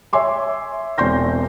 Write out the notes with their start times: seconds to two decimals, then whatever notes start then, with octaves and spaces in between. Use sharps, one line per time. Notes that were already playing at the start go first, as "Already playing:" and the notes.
0.13 C#5 E5 G#5 C6 D6
0.98 E1 C4 D5 C6 G6 A#6